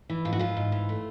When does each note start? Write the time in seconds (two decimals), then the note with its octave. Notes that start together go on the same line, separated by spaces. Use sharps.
0.10 E3
0.25 G#2 F4
0.33 F#4
0.39 E3 F4
0.57 G#2
0.72 E3
0.89 A3